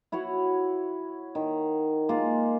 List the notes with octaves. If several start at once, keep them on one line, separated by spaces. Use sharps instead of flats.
E4 F#4 C#5 F#5
D#3
G#3 A#3 F4